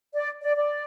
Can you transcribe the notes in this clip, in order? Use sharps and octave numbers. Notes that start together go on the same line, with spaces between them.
D5
D5
D5